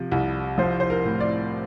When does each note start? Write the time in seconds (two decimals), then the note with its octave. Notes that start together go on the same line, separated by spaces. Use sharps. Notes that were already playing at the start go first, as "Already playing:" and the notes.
Already playing: C3 F3
0.12 C2
0.58 F3 C5
0.80 C5
0.90 A#4
1.05 A2
1.20 D5